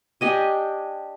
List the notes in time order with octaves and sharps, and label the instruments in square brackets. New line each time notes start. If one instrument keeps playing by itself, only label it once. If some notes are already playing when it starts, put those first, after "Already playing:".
[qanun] D4 G4 D#5 G#5